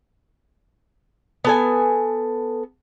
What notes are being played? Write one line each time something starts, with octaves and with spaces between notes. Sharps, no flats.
B3 A4 G#5